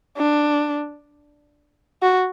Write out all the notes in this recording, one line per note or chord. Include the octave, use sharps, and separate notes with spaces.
D4
F#4